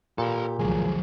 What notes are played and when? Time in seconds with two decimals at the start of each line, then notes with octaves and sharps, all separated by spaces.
0.18 A#2 G4 A4 B4
0.59 C2 F2 D#3 F3 F#3 G#4